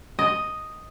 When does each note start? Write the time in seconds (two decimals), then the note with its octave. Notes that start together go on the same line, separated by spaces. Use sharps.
0.19 D#5